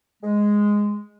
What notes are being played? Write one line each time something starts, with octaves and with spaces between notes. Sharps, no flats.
G#3